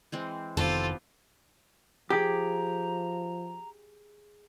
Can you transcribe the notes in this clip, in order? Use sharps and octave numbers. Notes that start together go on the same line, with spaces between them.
E3 G#3 C4
F1 D#3 B3 C4 F4 G4 A4 C5
F3 G4 G#4 A#5 D6